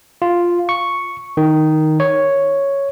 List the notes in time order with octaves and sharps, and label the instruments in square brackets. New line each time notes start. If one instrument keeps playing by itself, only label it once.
[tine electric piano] F4
C#6
D#3
C#5